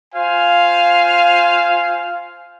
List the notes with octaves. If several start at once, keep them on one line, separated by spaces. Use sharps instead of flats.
F4 C5 F5 G#5